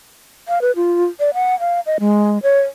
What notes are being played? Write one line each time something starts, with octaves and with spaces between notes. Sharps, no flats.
F5
B4
F4
D5
F#5
F5
D#5
G#3
C#5